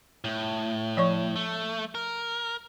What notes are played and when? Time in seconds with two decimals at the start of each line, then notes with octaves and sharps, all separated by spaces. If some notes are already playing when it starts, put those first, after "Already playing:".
0.24 A2
0.97 F3 C#5 C#6
1.36 A3
1.95 A#4